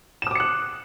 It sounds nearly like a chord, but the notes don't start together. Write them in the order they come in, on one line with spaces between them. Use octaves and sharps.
E7 D#6 D6 C#7 F#6